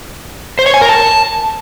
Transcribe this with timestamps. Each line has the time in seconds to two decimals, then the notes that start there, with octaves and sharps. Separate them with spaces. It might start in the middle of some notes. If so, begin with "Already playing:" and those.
0.59 C5
0.66 C#5
0.74 G#5
0.81 A#4
0.89 A5